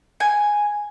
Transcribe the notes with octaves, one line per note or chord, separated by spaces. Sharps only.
G#5